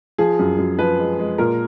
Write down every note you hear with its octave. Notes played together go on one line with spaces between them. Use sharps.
F3 G#4
F#2
F#2
F3 B4
G#3
G#3
A#2 A#4